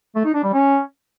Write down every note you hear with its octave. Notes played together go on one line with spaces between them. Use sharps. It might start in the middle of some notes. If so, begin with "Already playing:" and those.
A3
D#4
D4
G3
C#4